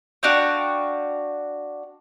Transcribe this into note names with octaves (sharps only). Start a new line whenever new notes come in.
D4 F#4 F5 G5